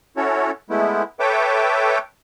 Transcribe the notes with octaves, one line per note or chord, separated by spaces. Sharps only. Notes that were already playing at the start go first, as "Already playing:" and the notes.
C#4 E4 F#4 A4 C#5
G#3 A3 B3 E4
A4 B4 C#5 E5 G5 D6